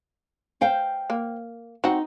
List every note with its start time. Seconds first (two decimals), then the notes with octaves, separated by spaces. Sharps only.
0.61 C5 F5 G5
1.10 A#3
1.84 C4 D#4 F#4